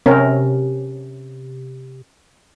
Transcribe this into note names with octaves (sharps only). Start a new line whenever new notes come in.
C3 C4 C#4 A#4